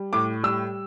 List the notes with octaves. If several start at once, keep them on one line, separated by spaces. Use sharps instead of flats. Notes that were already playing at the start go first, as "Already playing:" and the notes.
Already playing: G3
A2 D6
G3 E6